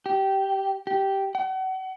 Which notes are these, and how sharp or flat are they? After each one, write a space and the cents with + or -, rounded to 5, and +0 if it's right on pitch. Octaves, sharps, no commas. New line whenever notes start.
G4 -15
G4 -10
F#5 +40